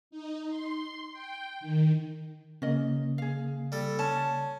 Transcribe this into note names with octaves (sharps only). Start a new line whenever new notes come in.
D#4
C6
G5
D#3
C#3 A#3 C#4 D#5
G#4 F5
G3 A4
C#4 A5